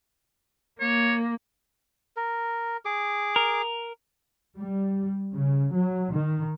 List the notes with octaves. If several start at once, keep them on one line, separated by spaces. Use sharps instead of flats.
A#3 C#5
A#4
G#4 D6
A#4
G3
C#3
F#3
D#3